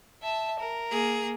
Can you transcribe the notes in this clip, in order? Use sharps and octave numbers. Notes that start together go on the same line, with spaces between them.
E5 A5
A#4
A#3 G#4